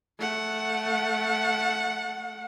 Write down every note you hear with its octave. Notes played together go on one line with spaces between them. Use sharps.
A3 F#5